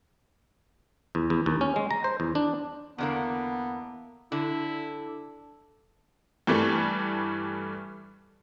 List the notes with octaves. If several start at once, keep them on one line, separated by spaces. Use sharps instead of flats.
E2
E2
D#2
C#4
G#3
A#5
C5
E2
D4
E2 D3 A#3 B3
D3 E4
G2 E3 G3 A3